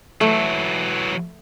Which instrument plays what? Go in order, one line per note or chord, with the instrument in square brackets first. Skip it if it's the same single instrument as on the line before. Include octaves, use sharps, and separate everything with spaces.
[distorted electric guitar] E3 F#3 [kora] A3